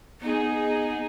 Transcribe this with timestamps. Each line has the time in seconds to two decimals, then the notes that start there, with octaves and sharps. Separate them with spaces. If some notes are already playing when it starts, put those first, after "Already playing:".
0.21 B3 D#4 G#4